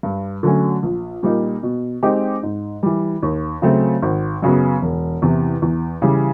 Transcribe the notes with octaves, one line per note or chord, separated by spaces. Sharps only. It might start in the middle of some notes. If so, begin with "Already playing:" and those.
G2
D3 F#3 A3 C#4
A#1
A#2 G3 A#3 D#4
B2
G#3 C4 D#4 G4
G#2
E3 G3
D#2
C#3 F#3 A3 C4
G#1
F#2 C#3 F#3 B3
E1
E2 C3 E3
E2
C#3 E3 G3